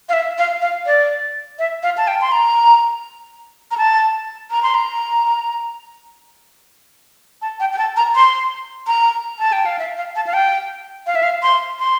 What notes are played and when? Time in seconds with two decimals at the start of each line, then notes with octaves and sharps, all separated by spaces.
0.09 F5
0.13 E5
0.38 F5
0.62 F5
0.86 D5
1.59 E5
1.83 F5
1.97 A5
2.08 G5
2.21 C6
2.32 A#5
3.71 A#5
3.78 A5
4.51 A#5
4.63 C6
4.75 A#5
7.42 A5
7.60 G5
7.73 G5
7.78 A5
7.97 A#5
8.15 C6
8.88 A#5
9.39 A5
9.52 G5
9.66 F5
9.79 E5
9.97 F5
10.16 A5
10.27 F5
10.33 G5
11.07 F5
11.15 E5
11.23 F5
11.43 C6
11.79 C6